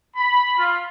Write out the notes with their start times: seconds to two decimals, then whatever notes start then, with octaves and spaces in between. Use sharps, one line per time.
0.15 B5
0.58 F4